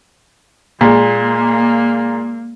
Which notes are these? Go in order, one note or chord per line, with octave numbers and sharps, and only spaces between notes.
A#2 G#3 A#3